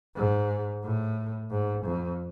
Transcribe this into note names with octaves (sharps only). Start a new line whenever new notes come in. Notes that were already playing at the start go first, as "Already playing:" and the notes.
G#2
A2
G#2
F2